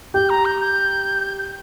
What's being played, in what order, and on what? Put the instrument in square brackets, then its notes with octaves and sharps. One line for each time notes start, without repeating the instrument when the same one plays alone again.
[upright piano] G4 [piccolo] G6
[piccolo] A#5
G6
G6